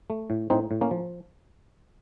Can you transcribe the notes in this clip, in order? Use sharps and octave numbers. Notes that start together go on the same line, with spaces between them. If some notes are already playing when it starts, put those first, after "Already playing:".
A3
A2
A2 C4 D#4
A2
A#3 C#4
F3